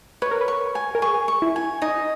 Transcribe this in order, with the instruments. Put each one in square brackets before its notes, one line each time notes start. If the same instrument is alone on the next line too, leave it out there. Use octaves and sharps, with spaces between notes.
[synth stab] B4 [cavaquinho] C#5
[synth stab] A#4
B4
[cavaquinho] C#6
G#5
[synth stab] A#4
[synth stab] G#4 [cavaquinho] C#6
[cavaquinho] C#6
[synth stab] E4
[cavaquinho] G#5
[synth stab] D#4 [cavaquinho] D#5